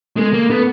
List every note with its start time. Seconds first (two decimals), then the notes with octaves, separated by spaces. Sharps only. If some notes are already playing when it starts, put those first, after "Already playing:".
0.16 G#3 A3
0.33 A#3
0.49 A3 B3